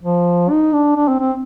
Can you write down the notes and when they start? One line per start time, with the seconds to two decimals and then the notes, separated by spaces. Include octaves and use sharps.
0.03 F3
0.50 D#4
0.73 D4
0.96 D4
1.08 C4
1.20 C4